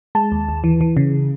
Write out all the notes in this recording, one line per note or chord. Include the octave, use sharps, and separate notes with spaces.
G#3 A5
D#2
D#2
E3
E3
C#3